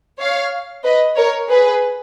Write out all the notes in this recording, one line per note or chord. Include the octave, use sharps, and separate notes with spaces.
C#5 F5
B4 D#5
A#4 C#5
G#4 B4